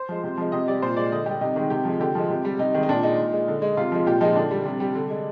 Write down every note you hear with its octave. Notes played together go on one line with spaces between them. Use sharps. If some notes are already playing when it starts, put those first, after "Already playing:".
Already playing: C5
F3 G#3
C3
F3 G#3
C3 D#5
G3 D5
A#2 C5
G#3 D5
D3 D#5
G3 G4
C3 D#4
D#3 G#3
C3 G4
F3 G#3
D3 G4
F3 G#3
C3
G3
C3 D#4
D#3 G#3
D#4
A#2 D4
G#3 D#4
A#2
G#3
D3
G#3
C3 F4
F3 G#3
A#2 G4
F3 G#3 D#4
D3 D4
G3
C3
G3
D3
G#3